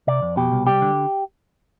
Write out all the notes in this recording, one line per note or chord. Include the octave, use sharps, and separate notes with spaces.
C3 D5
F2
B2 G4
C2
G3 G4
D3